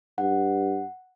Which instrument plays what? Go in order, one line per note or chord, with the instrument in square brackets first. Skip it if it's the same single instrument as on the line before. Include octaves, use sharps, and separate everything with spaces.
[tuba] G2 [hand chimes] F#5